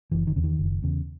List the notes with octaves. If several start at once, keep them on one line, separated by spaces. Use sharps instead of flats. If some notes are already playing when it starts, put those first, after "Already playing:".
F#1 E3
D#3
E2 C#3
D#3
F#1
E2 C#3